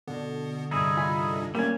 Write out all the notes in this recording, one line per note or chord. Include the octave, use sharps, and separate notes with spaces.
B2 D3 B3
G2 C3 G3 D#4 E4 G#4
F4 G#5 B5
F#3 G3 A3 A#3 C#4 G#5